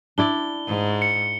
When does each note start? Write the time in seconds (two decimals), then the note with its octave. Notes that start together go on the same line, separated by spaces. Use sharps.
0.18 D4 E4 D5 G7
0.68 G#2
1.02 C#7